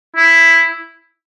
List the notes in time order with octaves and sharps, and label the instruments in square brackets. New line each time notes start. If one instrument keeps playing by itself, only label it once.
[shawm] E4